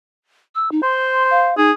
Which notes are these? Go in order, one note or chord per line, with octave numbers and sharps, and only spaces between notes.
E6
D#4
C5 C6
F5
D#4 G#4